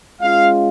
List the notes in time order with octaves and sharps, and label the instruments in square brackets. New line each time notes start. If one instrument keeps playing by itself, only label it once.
[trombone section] G#3 C#4 F4 [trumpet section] F5